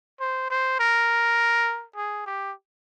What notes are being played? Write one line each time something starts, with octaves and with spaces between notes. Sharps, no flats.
C5
C5
A#4
G#4
G4